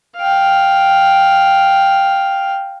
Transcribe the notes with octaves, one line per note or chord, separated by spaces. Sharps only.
F5 G5